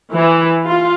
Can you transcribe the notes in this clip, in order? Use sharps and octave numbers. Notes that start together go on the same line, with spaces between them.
E3
F4